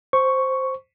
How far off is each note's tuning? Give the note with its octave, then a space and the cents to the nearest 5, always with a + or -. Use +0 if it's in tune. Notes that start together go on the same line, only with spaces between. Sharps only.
C5 +0 C#6 +0